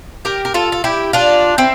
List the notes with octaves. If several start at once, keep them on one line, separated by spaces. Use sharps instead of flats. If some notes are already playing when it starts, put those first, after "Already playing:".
G4 A#4
A#4
F4 A4
A4
E4 G4
D4 F4
C4 E4